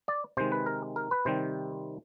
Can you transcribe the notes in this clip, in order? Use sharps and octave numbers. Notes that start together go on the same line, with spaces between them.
D5
C3 D#3 G#3 C5
B4
A#4
A#4
B4
C3 D#3 G3 C4 C5